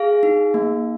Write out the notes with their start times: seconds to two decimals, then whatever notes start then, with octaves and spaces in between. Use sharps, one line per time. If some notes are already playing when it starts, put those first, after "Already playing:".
Already playing: G#4 F5
0.23 D#4
0.54 A#3